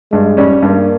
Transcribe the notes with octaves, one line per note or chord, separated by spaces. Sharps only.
G2 G#3
G3 C#4
G2 A#3